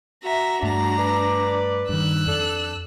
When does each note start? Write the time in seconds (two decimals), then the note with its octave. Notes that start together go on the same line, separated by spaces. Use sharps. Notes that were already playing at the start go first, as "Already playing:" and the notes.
0.23 F#4 E5 A#5
0.63 G2 A3 D4 A#5
0.97 B4 D5
1.89 G2 D#3 E6 F#6
2.26 F2 D4 A4